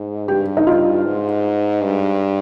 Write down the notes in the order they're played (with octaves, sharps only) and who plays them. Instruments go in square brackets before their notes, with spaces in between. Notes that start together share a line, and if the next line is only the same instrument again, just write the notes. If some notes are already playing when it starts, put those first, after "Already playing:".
Already playing: [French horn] G#2
[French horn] G2 [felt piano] G4
[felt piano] D#4
F4
[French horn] G#2
G2